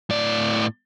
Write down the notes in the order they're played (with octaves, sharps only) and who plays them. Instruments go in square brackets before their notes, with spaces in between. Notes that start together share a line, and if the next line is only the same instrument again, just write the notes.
[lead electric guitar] A2 D5